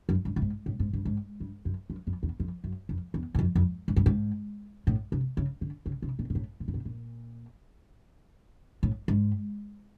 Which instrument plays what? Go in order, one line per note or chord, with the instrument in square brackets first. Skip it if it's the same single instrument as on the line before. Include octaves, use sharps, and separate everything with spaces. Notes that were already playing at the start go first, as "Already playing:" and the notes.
[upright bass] F#2
G2
A2
G#2
A2
G#2
G2
G#2
G2
F#2
F#2
F2
E2
F2
F#2
F2
E2
F#2
F2
F2
G#2
G2
G#2
A2
C3
C#3
D3
C#3
C3
A#2
A#2
A2
A#2
A2
A#2
A#2
A2
G#2